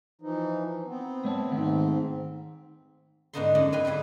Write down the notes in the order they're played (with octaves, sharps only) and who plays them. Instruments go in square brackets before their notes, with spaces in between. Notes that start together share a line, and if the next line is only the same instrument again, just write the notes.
[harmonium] E3 F3 D#4
B3 C4
[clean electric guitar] A3 C#5 A5
[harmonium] G#2 C4 [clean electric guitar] D#3 A3 B3
[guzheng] G#2 D3 B3 D#4 A4 C6
F#2 A3 D#4 D5 F#5 C6
C4 G#4 B4 F5 G5 G#5
D3 G3 C4 E4